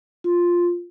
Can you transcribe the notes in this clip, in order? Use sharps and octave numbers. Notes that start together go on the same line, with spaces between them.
F4